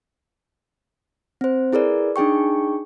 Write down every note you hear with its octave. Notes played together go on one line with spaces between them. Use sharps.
C4 C5
E4 G#4 A#4 B4 D5
D4 D#4 G#4 G5 C#6